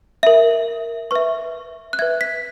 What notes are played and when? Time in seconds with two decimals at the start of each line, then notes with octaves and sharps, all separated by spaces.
0.23 A#4 E5
1.11 B4 E5 C#6
1.93 F#6
1.99 B4 E5 G#6
2.21 B6